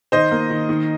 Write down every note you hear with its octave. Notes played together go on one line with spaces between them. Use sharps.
D#3 C5 D#5
A#3
D#3
D#3